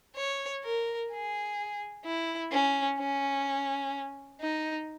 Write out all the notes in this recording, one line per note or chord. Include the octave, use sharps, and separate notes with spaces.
C#5
A#4
G#4
E4
C#4
C#4
D#4